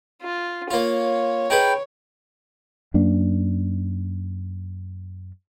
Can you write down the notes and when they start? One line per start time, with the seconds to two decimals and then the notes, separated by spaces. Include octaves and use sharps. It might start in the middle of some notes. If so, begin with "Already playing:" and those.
0.22 F4
0.71 A#3 F4 C#5
1.50 D#4 G#4 B4 G5
2.94 F#2 A#3 D4